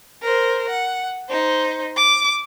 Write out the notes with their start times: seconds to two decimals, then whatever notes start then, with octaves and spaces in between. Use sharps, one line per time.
0.22 A#4 C5
0.69 F#5
1.29 D#4 C5
1.96 D6